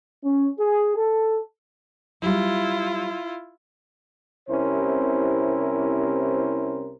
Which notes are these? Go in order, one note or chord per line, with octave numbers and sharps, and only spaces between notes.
C#4
G#4
A4
F#3 G3 E4 F4
C2 C3 C#4 E4 A#4 C5